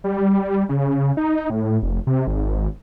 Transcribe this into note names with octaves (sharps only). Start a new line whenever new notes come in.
G3
C#3
D#4
A2
F1
C3
G#1